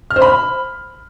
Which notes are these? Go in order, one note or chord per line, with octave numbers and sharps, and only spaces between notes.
F6
C5
B5